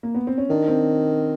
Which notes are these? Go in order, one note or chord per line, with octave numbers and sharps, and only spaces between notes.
A#3
B3
C4
C#4
D#3 D4
C4